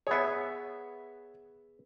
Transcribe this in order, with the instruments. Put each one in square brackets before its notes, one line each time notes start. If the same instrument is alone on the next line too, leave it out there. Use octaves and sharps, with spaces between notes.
[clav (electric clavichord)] B3 G#4 [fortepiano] C#5 E5